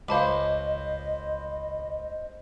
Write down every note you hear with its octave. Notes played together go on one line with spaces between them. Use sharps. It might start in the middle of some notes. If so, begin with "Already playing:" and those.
C#2 C5 D#5 F5 A5 B5 D6